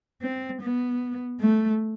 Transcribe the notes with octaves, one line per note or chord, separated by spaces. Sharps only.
C4
B3
A3